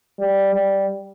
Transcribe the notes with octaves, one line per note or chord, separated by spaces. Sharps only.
G3
G3